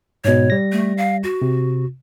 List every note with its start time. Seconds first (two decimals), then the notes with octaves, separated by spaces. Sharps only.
0.25 G#2 B2 C#5
0.50 G3 A#6
0.72 A3
0.97 F5
1.24 F#4
1.42 C3